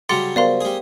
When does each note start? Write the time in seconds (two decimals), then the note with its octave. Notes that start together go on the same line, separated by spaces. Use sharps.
0.09 C#3 F#3 G3 C6 D6 A6 C#7
0.36 B3 A#4 C5 D5 F5 C6
0.61 G3 G#4